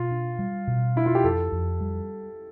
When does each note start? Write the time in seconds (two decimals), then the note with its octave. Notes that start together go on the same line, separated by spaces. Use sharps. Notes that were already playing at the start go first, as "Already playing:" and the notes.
Already playing: B2 F4
0.11 D4
0.39 G3
0.67 B2
0.96 D4 E4
1.06 F4
1.15 G4
1.24 F2 A4
1.52 F2
1.81 G3